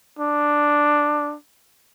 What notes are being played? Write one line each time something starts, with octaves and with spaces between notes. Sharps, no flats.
D4